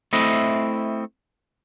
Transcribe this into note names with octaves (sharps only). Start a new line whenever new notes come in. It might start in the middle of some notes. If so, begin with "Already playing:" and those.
A3 C4 E4 D#5